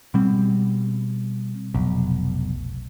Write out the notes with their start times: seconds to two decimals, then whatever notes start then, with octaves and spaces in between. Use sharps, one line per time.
0.14 B2 G3 C4
1.74 F1 B1